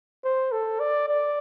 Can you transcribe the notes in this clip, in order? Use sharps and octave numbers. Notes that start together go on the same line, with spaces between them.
C5
A4
D5
D5